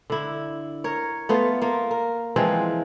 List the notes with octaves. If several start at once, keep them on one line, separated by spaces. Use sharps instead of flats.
D3 E4
A#4 C#5
A3 B3 F4 F5
A#3 F4
A#4
E3 F3 G#3 C4